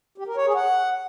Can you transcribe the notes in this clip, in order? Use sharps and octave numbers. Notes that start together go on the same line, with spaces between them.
G4
A#4
C#5
G#4
F#5